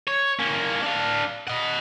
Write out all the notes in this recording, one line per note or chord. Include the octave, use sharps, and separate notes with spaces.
C#5
A#3 C#4
D4 F5
D#5 F#5